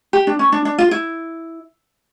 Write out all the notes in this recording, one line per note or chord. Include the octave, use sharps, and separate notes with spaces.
G4
D4
C#4
D4
D4
F4
E4